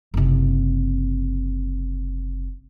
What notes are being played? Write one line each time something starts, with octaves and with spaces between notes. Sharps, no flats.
F#1 C3